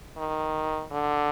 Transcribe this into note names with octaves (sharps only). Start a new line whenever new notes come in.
D#3
D3